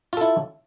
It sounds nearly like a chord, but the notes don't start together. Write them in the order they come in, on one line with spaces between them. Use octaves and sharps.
F4 A4 E4